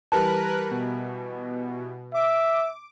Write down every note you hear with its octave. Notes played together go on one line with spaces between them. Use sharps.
E3 G3 A#4 B4 A5 F#6
B2
E5 D6